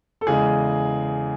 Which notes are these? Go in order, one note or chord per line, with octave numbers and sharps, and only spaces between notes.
A4
E2 C#3 E3 G#3 G#4